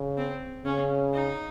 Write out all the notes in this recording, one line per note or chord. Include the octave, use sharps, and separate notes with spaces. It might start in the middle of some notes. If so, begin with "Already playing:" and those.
Already playing: C#3
C4
C#3 C#4
D#4